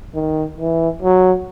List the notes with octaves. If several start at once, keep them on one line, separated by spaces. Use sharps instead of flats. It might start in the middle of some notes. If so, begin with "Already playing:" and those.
D#3
E3
F#3